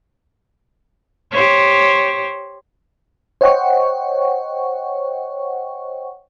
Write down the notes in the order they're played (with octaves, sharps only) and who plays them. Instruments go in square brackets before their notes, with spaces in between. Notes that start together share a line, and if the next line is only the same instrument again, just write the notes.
[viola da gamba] G4 C5 C#5
[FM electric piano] C5 C#5 D#5 F#5 G5 C#6